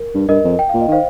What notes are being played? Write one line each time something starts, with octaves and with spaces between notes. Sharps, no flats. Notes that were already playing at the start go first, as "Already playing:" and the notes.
Already playing: A#4
G2
G2 A#4 D#5
F2
G5
A#2 F5
D#5
D#3 C5 F5